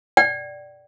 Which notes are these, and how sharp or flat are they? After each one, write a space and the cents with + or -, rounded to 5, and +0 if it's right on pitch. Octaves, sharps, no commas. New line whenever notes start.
D5 +0 G5 -45